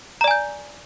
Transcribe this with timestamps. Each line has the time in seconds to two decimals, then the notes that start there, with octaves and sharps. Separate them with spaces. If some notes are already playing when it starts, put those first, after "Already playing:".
0.21 A#5
0.24 D5
0.28 G#5
0.31 G6